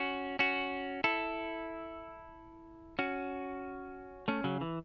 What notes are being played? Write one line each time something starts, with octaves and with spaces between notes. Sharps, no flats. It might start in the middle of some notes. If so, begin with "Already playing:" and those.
Already playing: C#4 F#4
C#4 F#4
E4 A4
C#4 F#4
A3 C#4
C#3 F#3
E3